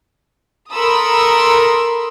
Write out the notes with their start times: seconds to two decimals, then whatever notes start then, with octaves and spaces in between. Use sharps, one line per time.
0.73 A4 A#4 B5 C6 D#6 E6